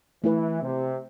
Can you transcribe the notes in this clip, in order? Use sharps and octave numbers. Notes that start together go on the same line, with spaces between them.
E3 A3 E4 B4
C3